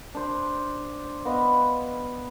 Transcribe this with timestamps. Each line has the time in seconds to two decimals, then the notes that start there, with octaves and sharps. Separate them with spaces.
0.15 D4 C5
1.25 B3 B4 D#5 F5